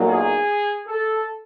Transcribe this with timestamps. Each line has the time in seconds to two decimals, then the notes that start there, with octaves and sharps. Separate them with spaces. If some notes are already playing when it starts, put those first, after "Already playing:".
Already playing: B1 A#2 F#3
0.08 G#4
0.87 A4